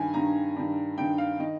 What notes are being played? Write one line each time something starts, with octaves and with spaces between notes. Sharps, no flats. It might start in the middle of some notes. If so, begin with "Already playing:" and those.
Already playing: G2 D#3 G#5
G2 D#3 A#5
G2 D#3
G2 D#3 G5
F5
D#3 D#5